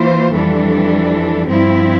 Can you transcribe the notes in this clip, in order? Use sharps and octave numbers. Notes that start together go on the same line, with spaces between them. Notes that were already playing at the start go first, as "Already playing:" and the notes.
Already playing: E3 A#3 F4 C5
F2 E3 G3 D4 A4
G2 F3 C4 E4